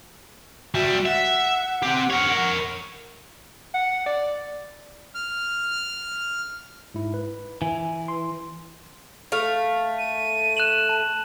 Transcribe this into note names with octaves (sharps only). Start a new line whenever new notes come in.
G3 F#4 E5
E5 F#5
C4 G4
A#4 C#5
F#5
D5
F6
G#2 E4
B4
E3 G#5
C6
A3 F5
D#7
F#6 E7 F#7
A5